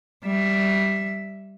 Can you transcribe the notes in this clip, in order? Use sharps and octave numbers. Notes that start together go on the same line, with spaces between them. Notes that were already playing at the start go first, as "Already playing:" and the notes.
G3 E5